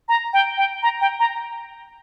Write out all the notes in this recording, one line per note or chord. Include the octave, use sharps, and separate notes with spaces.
A#5
G5
G5
A#5
G5
A#5